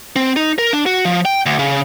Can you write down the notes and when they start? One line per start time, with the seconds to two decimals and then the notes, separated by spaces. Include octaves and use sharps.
0.16 C4
0.36 D#4
0.58 A#4
0.73 D4
0.86 F#4
1.05 F3
1.25 G5
1.46 D2
1.59 C#3